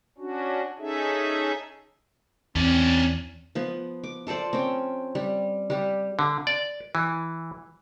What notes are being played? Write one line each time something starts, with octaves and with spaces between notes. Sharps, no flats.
C#4 D4 F#4
C#4 D#4 G#4 A4 E5
E2 C4 C#4 D5
F3 B3
D6
F4 A4 C5 D5
C4 C#4 G5
G3
G3 G4
D3
D5
E3